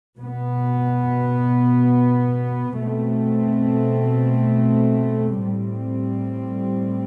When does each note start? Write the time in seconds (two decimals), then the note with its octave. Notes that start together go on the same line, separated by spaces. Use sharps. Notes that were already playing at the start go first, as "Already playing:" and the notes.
0.18 B2 B3
2.79 B2 A3 C4
5.40 A2 G3 C4